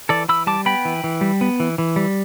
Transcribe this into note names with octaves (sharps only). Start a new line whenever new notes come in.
E3 A4 D5
E3 B5 E6
G3 A5 D6
B3 G5 B5
E3
E3
G3
B3
E3
E3
G3